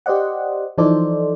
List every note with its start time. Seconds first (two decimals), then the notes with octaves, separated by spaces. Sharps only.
0.06 G4 C5 D5 D#5 F#5
0.78 E3 F3 D#4 A4 C5 D5